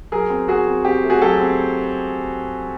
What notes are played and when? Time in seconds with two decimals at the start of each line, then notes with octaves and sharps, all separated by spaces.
0.12 F#3 G#4 A#4
0.30 C4
0.48 C4 F#4 G#4
0.67 C4
0.85 C4 G4
1.04 A3
1.10 F#4 G#4
1.22 F#3 G4 A4
1.40 C4